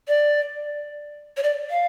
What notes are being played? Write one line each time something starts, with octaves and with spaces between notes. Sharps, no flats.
D5
C#5
D5
F5